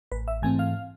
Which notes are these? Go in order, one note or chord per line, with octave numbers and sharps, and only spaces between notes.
A1 B4
E5
G#2 E3 A3 C4 G#5
F5